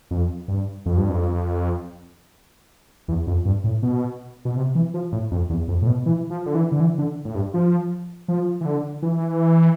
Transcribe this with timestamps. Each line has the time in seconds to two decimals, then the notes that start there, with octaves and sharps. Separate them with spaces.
0.11 F2
0.48 G2
0.86 F2
0.97 G2
1.10 F2
3.08 E2
3.27 F2
3.45 G2
3.64 A2
3.82 B2
4.45 B2
4.57 C3
4.75 E3
4.94 F3
5.12 A2
5.31 F2
5.50 E2
5.68 F2
5.82 A2
5.87 B2
6.06 E3
6.30 F3
6.46 D3
6.55 E3
6.72 D3
6.80 E3
6.98 D3
7.25 A2
7.35 G2
7.54 F3
8.28 F3
8.61 E3
8.65 D3
9.02 E3